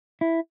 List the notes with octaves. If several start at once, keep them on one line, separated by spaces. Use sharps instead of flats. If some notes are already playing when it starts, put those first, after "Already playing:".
E4